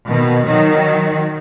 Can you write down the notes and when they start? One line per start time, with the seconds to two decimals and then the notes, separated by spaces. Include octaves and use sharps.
0.09 B2 D#3
0.47 D#3 F#3